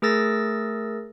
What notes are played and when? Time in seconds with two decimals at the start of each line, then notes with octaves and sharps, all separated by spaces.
0.02 A3 G#4 A#4 E6 A6 A#6